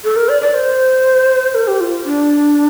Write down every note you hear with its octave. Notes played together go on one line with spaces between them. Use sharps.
A4
A#4
D5
D5
C5
A#4
G4
F4
D4